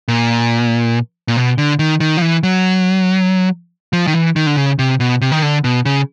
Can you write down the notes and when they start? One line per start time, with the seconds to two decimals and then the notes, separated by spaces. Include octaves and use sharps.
0.08 A#2
1.28 A#2
1.36 B2
1.58 D3
1.79 D#3
2.00 D#3
2.17 F3
2.22 E3
2.43 F#3
3.93 F3
4.07 D#3
4.14 E3
4.36 D#3
4.47 D3
4.56 C#3
4.79 C3
5.00 B2
5.21 C3
5.32 D#3
5.42 D3
5.64 B2
5.85 C#3